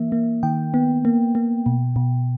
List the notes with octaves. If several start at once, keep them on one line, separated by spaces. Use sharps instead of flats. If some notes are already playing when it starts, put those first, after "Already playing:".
Already playing: E3 A#3 E5
A#3
D#3 G5
B3
A#3
A#3
B2
B2